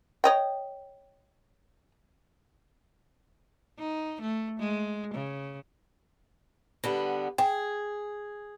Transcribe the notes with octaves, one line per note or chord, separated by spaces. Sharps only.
C#5 D#5 G5
D#4
A3
G#3
C#3
D3 G3 B3
G#4 G5